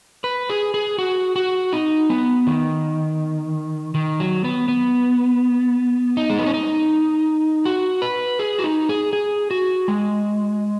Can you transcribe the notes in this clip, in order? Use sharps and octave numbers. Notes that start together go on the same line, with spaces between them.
B4
G#4
G#4
F#4
F#4
D#4
B3
D#3
D#3
F#3
B3
B3
D#4
G#3
B3
C#4
D#4
F#4
B4
G#4
F#4
D#4
G#4
G#4
F#4
G#3